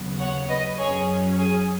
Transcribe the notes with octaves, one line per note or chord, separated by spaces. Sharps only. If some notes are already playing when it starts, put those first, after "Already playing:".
Already playing: D#2 C#3 F#3 B3
C#5 F#5
B4 D#5
F#2 F#3 C#4 G#4 C#5
G#4